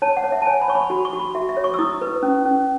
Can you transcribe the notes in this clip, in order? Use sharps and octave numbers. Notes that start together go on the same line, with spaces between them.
C#5 A5
F#5
C#5
E5
A5
C#5 G#5
B5
C#5 C#6
B5
F#4 B5
C#6
F#4
B5
F#4 E5
E5
C#5
C#6
E6
E4 D#6
B4
C#4
C#4